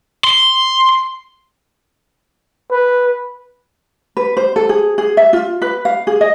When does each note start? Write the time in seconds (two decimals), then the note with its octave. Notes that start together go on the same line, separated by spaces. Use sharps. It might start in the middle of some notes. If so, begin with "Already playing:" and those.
0.24 C6
2.71 B4
4.17 B4
4.37 C5
4.56 A4
4.69 G#4
4.98 G#4
5.17 E5
5.33 F4
5.62 B4
5.85 F5
6.07 G#4
6.21 D#5